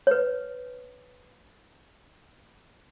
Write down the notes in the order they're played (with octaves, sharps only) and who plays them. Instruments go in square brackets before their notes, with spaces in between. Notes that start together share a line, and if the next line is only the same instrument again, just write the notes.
[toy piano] B4 C#5